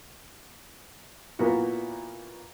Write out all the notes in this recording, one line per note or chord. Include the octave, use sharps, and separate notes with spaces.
A#2 A#3 B3 E4 F#4